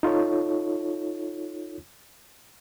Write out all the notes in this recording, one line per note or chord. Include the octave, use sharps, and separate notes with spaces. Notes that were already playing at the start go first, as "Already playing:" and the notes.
D#4 F4 A4 C#5